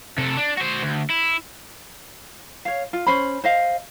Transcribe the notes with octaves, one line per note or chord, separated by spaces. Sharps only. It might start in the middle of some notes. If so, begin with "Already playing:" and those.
C3 A4
D4
F#4 C5
D2
E4
C#5 F5
F4
C#4 C5 B5
C5 D#5 F5